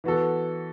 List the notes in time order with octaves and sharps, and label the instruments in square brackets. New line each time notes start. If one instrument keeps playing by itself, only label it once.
[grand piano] E3 B3 F#4 A4